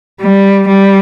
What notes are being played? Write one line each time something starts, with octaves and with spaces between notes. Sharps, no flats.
G3
G3